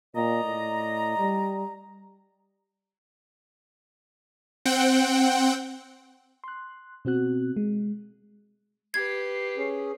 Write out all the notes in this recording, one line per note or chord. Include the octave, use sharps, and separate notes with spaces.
A#2 D5 D#5 A#5
A2
G3
C4 F#5 G5
C6 F#6
B2 C4 F#4 F#6
G#3
G4 B4 G#6 C7
C#4 G#4